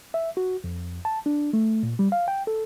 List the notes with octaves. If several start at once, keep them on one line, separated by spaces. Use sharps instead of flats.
E5
F#4
F2
A5
D4
A3
A#2
G3
F5
G5
A4